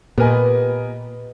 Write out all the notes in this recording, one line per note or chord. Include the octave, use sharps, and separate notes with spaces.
A#2 B3 G4 A#4 B4 D#5 G#5